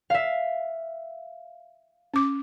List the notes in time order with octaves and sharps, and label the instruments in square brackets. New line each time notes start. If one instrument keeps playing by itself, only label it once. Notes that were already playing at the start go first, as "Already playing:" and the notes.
[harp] E5 F5
[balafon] C#4 D6